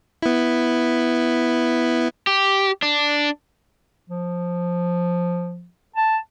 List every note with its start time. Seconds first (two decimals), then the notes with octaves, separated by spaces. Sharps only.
0.22 B3 E4
2.27 G4
2.82 D4
4.10 F3
5.96 A5